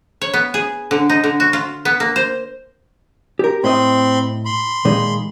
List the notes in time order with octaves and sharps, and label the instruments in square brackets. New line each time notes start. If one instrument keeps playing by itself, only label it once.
[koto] C#5
B3
G#4
D3
D#4
D3
F#4
F4
B3
A#3
C5
[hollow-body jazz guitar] G4 A#4
[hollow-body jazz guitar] A2 D#5 [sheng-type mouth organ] C4 B5 C6
[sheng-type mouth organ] B5 C6
[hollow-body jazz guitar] A#2 D#3 G#3